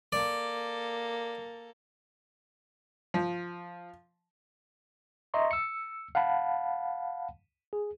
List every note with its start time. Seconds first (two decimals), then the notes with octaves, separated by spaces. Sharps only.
0.12 A#3 A4 D5
3.14 F3
5.34 D#5 E5 A#5 C6 C#6
5.51 E6 C#7
6.15 F5 F#5 A5 B5
7.73 G#4